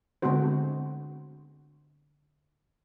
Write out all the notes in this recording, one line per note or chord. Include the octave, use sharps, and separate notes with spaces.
D3 G#3 B3 C4 F#4 C5